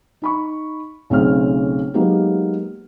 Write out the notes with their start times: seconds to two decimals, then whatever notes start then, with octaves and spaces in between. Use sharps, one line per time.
0.22 D#4 B5 C#6
1.10 B1 C#3 A3 C4 C#5 F6
1.94 F#3 G#3 A#3 B3 D#4 G4